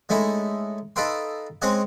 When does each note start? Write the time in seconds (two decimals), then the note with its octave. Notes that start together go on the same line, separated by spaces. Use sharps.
0.09 G#3 A3 C#4 D#4 E4
0.96 D#4 A4 B4 F5 G5 C6
1.62 G#3 C4 C#4 C#5 D#5 F#5